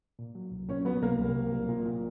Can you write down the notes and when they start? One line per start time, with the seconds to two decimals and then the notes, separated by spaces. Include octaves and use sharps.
0.19 A#2
0.35 F#3
0.52 C2
0.68 A#2 C#4 C#5
0.85 F#3 B3 B4
1.02 C2 A#3 A#4
1.19 C2
1.36 C2
1.52 A#2
1.69 A#2
1.85 A#2